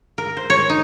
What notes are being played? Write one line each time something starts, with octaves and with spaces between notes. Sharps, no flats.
A#4
C5
C#5
D#4